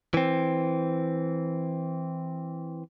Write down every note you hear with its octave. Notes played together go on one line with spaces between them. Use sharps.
E3 C4